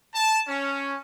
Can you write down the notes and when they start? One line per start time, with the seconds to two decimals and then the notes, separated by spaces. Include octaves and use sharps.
0.14 A5
0.48 C#4